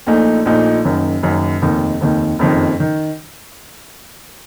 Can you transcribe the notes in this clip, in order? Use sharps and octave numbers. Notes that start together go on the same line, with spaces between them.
A#1 A#2 A3 D#4
A#1 A#2 A3 D#4
F#1 F#2 D#3
F#1 F#2 D#3
F1 D#2 D#3
F1 D#2 D#3
F#1 F2 D#3
D#3